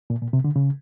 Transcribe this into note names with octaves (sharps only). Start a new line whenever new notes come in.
A#2
A#2
C3
D3
C#3